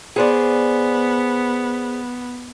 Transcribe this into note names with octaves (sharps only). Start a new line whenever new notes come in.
B3 G#4 C5 D5